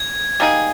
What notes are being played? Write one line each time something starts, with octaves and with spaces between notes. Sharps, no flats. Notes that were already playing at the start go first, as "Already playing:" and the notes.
Already playing: G#6
G3 A#3 D#4 G#4